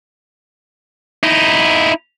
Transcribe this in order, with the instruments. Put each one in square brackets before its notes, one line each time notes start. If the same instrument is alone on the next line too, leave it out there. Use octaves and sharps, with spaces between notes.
[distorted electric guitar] D#4 E4